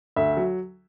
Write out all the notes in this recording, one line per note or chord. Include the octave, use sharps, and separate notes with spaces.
D2 E5
F#3